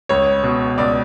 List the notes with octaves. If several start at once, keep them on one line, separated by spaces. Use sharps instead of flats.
C#2 C#5
B2
C#2 D5